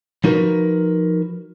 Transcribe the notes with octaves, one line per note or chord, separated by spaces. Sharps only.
F3 D#4 F#4 A#4 B4